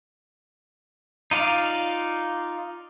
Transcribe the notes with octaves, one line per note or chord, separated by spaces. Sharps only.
D#4 F4 D5 F5